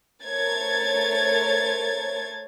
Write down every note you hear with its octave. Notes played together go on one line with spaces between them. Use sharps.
A3 A#4 C5 C#5 G#6 A6